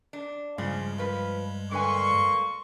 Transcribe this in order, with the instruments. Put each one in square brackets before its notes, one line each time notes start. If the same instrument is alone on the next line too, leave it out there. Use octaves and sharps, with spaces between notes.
[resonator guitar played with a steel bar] D4
[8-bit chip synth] G2 G3 G#3 [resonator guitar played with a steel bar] C#3 F3
[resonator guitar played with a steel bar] F3 B4
[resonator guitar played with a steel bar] D3 B4 G#5 [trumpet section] A#3 C6 C#6